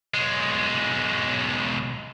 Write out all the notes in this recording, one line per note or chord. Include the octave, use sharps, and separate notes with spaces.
B1 G#3